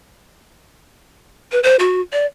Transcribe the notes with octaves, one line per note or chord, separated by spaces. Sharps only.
B4
C5
F#4
D5